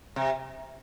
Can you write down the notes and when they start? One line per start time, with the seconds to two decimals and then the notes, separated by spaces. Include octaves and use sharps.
0.16 C3